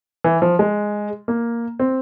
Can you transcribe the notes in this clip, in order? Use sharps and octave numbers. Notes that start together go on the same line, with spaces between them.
E3
F3
G#3
A#3
C4